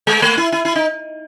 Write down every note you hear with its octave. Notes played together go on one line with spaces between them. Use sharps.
G#3
A3
E4
E4
E4
D#4